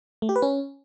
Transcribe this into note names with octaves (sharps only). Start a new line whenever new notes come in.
A3
G4
B4
C#4